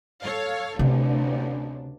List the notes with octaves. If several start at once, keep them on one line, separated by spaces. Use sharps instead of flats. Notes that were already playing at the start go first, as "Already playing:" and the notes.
A4 C#5 F5
A1 D2 C3 D4